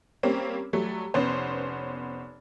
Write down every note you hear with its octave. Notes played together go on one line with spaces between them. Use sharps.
G3 A#3 C4 C#4
F#3 G3 A3
F1 B3 C#4 C5